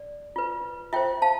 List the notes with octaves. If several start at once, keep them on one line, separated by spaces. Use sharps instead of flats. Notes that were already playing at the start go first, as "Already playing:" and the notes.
Already playing: D5
F4 B4
F4 C5 E5 G5
F5 A5